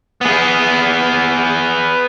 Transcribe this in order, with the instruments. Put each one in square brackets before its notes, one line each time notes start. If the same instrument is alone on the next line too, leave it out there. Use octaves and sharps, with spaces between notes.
[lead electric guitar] B3 G#4